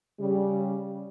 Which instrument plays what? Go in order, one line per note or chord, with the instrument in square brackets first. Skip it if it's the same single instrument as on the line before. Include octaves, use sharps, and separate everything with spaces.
[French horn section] C#3 G3